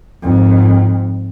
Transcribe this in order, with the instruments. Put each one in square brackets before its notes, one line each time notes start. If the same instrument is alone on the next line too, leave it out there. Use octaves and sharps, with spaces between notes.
[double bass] F2 G#2